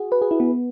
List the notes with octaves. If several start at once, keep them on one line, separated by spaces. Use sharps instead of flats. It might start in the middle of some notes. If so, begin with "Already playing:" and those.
Already playing: F#4 G#4
B4
G#4
E4
B3